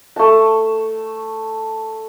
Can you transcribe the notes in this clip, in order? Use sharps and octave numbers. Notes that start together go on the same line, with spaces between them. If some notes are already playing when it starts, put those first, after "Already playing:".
A3 A5